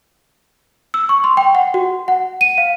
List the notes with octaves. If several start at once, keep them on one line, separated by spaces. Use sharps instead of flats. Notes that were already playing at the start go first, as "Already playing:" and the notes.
E6
C#6
C6
G5
F#5
F#4
F#5
D#7
F5